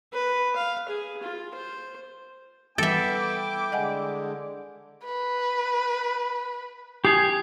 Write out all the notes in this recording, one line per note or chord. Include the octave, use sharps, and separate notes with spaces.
B4
F5
G#4
F4
C5
E3 G3 B3 E4 A4 E5 G5 D6
D3 G#3 D#5 F#5 G#5
B4
G4 G#5 D#6 C7 F#7